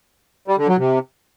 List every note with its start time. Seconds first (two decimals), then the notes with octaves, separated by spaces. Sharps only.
0.48 G3
0.58 D3
0.68 F#3
0.78 C3